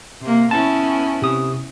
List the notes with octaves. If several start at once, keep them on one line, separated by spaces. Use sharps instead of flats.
C3 A#3
B3 C#4 E4 A5
C3 D#6